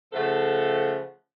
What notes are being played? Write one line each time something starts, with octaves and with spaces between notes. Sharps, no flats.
C#3 F3 A3 A4 F#5